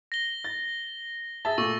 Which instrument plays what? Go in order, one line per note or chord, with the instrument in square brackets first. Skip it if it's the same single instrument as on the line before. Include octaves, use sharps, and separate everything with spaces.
[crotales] A#6 G7
[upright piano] A6
[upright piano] G#4 E5 A5 [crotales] A6
[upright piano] A#2 A3 [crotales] C#6 E6